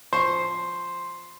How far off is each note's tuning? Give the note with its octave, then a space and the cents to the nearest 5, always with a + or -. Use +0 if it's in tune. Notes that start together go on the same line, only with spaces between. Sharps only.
F3 +0 C5 +0 C#6 -15